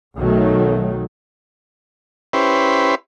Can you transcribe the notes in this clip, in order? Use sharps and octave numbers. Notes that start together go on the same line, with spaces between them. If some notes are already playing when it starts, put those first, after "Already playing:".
B1 D#3 F#3 A3
C#4 E4 G4 B4 C5